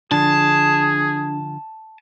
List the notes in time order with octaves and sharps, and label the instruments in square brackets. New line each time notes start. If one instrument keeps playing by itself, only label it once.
[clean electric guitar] D3 F3 [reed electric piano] D4 [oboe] G#4 [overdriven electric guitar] A5